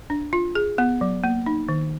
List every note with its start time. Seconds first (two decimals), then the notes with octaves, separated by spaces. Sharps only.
0.10 D4
0.33 F4
0.55 G#4
0.78 B3
1.01 F#3
1.24 A#3
1.46 D#4
1.69 D#3